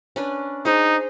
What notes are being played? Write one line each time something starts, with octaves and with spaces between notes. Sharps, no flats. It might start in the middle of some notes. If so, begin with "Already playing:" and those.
C#4 D4 B4
D#4 G#4 C5